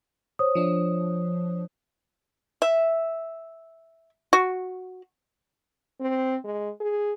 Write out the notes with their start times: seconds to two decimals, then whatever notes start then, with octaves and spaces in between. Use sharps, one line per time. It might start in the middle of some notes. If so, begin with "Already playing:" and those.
0.39 C5 C#5 D#6
0.55 F3 D4
2.62 E5
4.33 F#4
6.01 C4
6.45 G#3
6.80 G#4